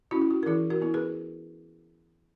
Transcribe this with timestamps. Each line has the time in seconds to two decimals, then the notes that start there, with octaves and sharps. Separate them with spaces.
0.11 C#4 E4 F#4
0.21 E4
0.31 F#4
0.43 A#4
0.46 E3 E4 G#4
0.70 F#4 A#4
0.82 B3 E4
0.94 G#4 B4